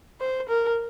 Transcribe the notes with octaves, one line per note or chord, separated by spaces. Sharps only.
C5
A#4